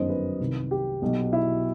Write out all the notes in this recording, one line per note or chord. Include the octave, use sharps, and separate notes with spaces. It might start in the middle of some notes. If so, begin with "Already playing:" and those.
Already playing: G1 F#2 D#3 F#3 C5 D#5
B4
C2 C3 D#3
G4
B1 B2 F#3
E4